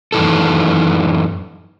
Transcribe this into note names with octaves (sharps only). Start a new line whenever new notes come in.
F#2 D#3 E3 A4